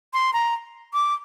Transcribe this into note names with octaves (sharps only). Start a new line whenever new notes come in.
C6
A#5
D6